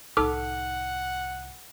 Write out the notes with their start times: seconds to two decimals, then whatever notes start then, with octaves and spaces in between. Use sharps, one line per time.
0.17 C2 A2 D#4 A4 F#5 D6 F6